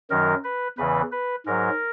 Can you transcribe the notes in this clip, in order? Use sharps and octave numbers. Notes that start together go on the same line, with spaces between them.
F#2 D#3 F#3 A#4
B4
E2 C#3 E3 B4
B4
G#2 F#3 A#4